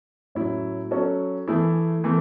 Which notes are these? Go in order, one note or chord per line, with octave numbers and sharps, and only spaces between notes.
A2 F#3 C#4 E4
F#3 C#4 F#4 A4
E3 A3 E4 G#4
E3 A3